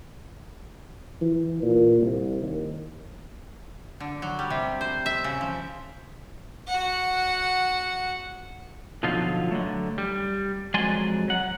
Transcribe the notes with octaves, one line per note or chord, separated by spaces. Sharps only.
E3
A#2
C2
D#2
D3
F#3
G3
C3
C5
E5
C#3
F3
F#4 F#5
B2 D3 F3 F#3 D#4 F4
D3 F#3 A3
G3
F2 F#3 G#3 D5 G#5 C6
F#3 F#5